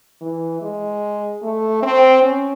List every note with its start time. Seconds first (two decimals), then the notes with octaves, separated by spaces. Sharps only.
0.22 E3
0.62 G#3
1.43 A3
1.83 C4
2.23 C#4